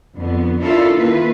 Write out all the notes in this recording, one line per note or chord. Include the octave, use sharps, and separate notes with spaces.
F2 D3 B3
C#4 D4 E4 F4 A4 A#4
D#3 A#3 E4 F4 B4